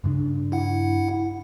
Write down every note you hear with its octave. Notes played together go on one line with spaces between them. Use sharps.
G2 C#3 D4
E4 F#5